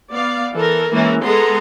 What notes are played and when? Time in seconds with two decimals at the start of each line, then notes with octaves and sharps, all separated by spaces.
0.12 B3 D5 F5
0.54 E3 A4 A#4
0.92 E3 G#3 A#3 C#4 E4 A#4
1.23 G#3 B3 G#4 A4 A#5 C6